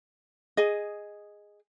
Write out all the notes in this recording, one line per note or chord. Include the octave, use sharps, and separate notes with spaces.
G#4 D#5